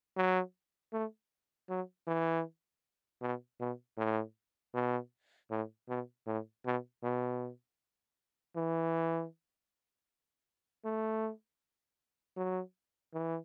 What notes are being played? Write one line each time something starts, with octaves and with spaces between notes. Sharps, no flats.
F#3
A3
F#3
E3
B2
B2
A2
B2
A2
B2
A2
B2
B2
E3
A3
F#3
E3